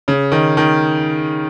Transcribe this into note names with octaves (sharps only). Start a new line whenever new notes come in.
C#3
D#3
D#3